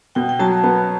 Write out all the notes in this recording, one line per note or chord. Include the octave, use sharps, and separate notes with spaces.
B2 G5
G5
F#3 A5
B3